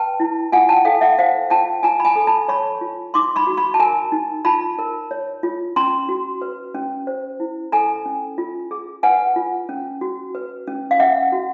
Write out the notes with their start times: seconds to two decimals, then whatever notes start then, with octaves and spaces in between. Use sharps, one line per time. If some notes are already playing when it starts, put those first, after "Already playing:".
Already playing: B4 G5 A5
0.20 E4
0.52 F4 F#5 G#5
0.69 G5 A5
0.85 A4 F5 G5
1.01 E5 F#5
1.18 C5 F5 G5
1.50 F4 G5 A5
1.83 F4 G#5 A#5
2.00 B5
2.05 G#5 A#5
2.16 A4
2.27 A5 B5
2.48 C#5 B5 C#6
2.81 F4
3.14 D#4 C6 D6
3.36 B5 C#6
3.47 F#4
3.57 B5 C#6
3.74 A5
3.79 A#4 G#5 A#5
4.12 D#4
4.45 F4 A5 B5
4.79 A#4
5.11 C#5
5.43 F4
5.76 C#4 A#5 C6
6.09 F#4
6.42 B4
6.75 C#4
7.07 C5
7.40 E4
7.72 A4 G#5 A#5
8.06 C#4
8.38 F4
8.71 G#4
9.03 B4 F#5 G#5
9.36 F4
9.69 C#4
10.01 F#4
10.35 B4
10.67 C#4
10.91 F5
10.99 C#4 E5 F#5
11.32 F#4